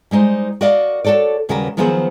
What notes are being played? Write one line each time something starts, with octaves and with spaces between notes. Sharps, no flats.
G3 G#3 D#4 C5
F#4 A#4 D5 D#5 F5
F#4 G4 A4 C#5 D5
D#2 C#3 G3 F#4 A#4 B4
D#3 F3 F#3 B3 G#4 C5